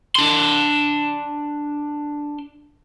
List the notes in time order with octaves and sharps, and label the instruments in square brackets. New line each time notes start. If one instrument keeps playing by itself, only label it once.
[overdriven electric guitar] D4 C6